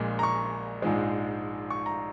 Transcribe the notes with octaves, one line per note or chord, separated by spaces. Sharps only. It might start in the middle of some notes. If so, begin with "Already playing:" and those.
Already playing: A#1 A#2 G#3
A#5
C#6
A#1 G#2 F3 G#3
C#6
A#5